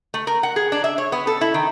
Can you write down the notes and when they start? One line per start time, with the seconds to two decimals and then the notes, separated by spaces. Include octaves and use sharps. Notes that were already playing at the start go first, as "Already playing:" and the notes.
0.14 A3
0.27 A#4
0.43 F#5
0.56 G#4
0.72 D4
0.84 E5
0.98 C#5
1.12 B3
1.27 A4
1.41 E4
1.54 D#3